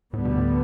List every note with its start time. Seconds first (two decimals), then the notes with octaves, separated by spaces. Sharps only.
0.13 D2 A2 D3 G3 B3
0.25 B2
0.38 A2